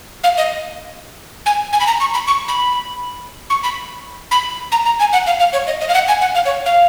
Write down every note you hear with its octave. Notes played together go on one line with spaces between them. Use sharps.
F5
D#5
G#5
G#5
B5
A#5
C#6
B5
C#6
B5
C#6
B5
B5
A#5
A#5
G#5
F#5
F5
F5
C#5
D#5
D#5
F5
F#5
G#5
F#5
F5
C#5
F5